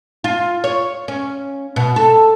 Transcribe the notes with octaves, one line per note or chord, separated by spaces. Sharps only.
F4
C#5
C#4
B2
A4